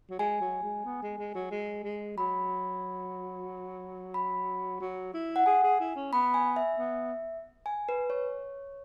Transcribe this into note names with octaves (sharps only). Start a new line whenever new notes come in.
F#3
G#3 G#5
F#3
G#3
B3
G#3
G#3
F#3
G#3
G#3
F#3 B5
B5
F#3
E4
F#5
G#4 G#5
G#4
E4
C#4
B3 B5
G#5
E5
B3
G#5
B4
C#5